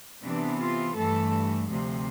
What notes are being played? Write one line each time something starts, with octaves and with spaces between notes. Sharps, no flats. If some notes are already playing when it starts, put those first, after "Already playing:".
C3 E3 B3 D4
F4
G2 E3 A3 A4
D2 C3 F3